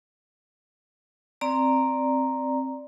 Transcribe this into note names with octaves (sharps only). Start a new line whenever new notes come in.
C4 D5 A#5